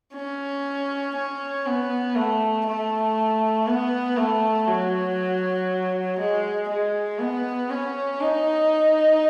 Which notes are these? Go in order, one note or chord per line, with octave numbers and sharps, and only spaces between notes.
C#4
C#4
B3
A3
A3
B3
A3
F#3
G#3
G#3
B3
C#4
D#4